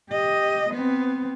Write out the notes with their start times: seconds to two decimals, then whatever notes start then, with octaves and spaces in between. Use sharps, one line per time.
0.11 G4 D#5
0.70 B3 C4